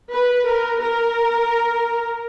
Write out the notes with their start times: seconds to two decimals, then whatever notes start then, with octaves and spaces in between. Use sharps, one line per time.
0.12 B4
0.47 A#4
0.81 A#4